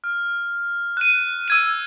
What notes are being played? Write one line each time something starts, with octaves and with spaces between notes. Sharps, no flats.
F6
F#6 D#7
E6 G#6 D#7